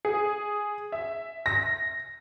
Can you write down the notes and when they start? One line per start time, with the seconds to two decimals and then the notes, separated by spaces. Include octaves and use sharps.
0.05 G#4
0.92 E5
1.46 A#6